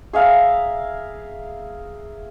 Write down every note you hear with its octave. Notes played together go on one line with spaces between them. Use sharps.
G#4 E5 F5 A#5